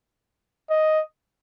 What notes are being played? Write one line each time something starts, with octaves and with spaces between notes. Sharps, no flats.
D#5